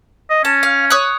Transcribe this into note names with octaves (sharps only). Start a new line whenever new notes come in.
D#5
C#4 A5
F5
C#5 D#6 F#6